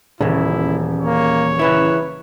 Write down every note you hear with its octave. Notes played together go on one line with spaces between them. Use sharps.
D#1 E2 A#2 C#3 E4
A#3 C#5
C#3 E3 E4 B4